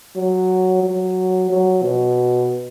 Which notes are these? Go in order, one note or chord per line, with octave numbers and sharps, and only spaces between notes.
F#3
F#3
F#3
B2